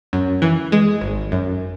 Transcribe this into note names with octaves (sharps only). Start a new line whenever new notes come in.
F#2
E3
G#3
G#1
F#2